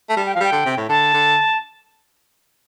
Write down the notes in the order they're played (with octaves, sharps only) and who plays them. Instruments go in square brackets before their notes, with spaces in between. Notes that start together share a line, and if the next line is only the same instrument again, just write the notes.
[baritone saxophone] A3
[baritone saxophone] G3 [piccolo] A5
[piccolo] G5
[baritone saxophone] F3 [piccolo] F5
[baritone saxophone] G3 [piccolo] G5
[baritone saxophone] D3
C3
A2
[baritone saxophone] D3 [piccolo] A5
[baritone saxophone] D3